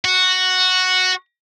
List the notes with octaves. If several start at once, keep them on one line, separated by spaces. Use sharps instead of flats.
F#4